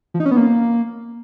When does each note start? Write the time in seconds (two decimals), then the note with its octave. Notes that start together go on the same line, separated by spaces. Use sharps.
0.14 F3
0.20 D#4
0.26 C#4
0.31 B3
0.37 A#3